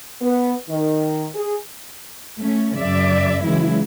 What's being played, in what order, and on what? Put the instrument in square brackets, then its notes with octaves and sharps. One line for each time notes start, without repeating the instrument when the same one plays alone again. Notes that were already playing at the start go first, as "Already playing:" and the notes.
[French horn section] B3
D#3
G#4
[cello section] A3 C#4
F#2 C#3 D5 E5
C#3 E3 F#3 G#3 E4